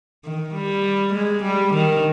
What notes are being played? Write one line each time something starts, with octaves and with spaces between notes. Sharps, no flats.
D#3
G3
G#3
G3
D#3